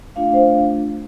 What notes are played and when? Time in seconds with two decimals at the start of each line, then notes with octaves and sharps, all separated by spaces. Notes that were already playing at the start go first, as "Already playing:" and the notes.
0.16 A3 D4 F4 F5
0.33 C5